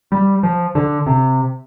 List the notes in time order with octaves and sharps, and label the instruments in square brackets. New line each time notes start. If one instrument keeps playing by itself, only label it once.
[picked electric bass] G3
F3
D3
C3